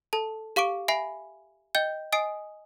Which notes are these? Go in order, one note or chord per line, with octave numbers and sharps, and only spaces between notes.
A4 A5
G4 F5 C#6 D6 D7
E5 G#5 B5 C7
D#5 G5 G6 G7
D#5 G#5 D#6 C7 D7